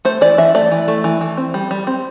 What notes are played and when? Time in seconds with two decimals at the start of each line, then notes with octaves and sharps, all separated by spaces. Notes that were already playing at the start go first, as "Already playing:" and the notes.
0.05 A3 C5
0.21 E3 D5
0.38 E3 E5
0.55 A3 D5
0.71 E3
0.88 A3
1.04 E3
1.21 E3
1.37 C4
1.54 G3
1.71 G3
1.87 C4